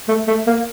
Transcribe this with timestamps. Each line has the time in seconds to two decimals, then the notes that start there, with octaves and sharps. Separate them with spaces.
0.08 A3
0.27 A3
0.47 A#3